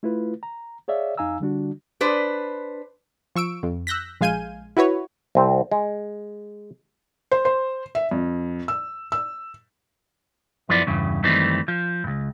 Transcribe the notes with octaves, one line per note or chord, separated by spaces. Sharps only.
A3 E4 F4 B4
A#5
G#4 C#5 D5 E5 F5
F2 D#4 F5 G#5 A#5 E6
D3 G3 D4 F#4
D4 B4 C5
F3 C#6 E6 D7
F2
E6 F#6 G6 A#6 B6
A#1 G#3 F5 G#5 G6 D#7
E4 F#4 B4 C#5
C2 C4
G#3
C5
C5
E5
F2
E6
E6
F#2 F3 B3 E4 D5
E2 G2 C#3
F#2 D#3 E3 G3 A3 C4
F3
C#2 G2